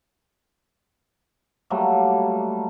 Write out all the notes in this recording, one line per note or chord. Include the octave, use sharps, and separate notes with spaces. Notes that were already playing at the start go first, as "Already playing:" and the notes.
F#3 G3 A3 A#3